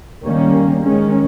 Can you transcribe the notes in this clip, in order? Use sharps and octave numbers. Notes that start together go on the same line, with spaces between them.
D#3 G3 A#3 C#4
D#3 G#3 C#4